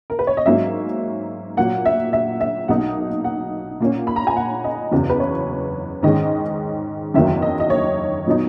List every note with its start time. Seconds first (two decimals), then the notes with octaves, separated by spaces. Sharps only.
0.10 A#4
0.19 B4
0.27 C#5
0.37 D#5
0.46 G#2 F#3 A#3 C#4 E5
1.57 A#2 F#3 A#3 F#5
1.86 E5
2.13 E5
2.41 E5
2.68 B1 B2 A#3 D#4 F#5
3.24 F#5
3.80 A#2 A#3 C#4
4.07 B5
4.16 A#5
4.27 G#5
4.36 F#5
4.64 D#5
4.91 F#1 E2 C#3 F#3
5.10 B4
5.20 C#5
6.03 G#2 D#3 G#3 C#4 D#5
7.14 F#1 E2 D#3 F#3 A#3 E5
7.42 D#5
7.60 D#5
7.70 C#5
8.27 A#2 F#3 B3 D#4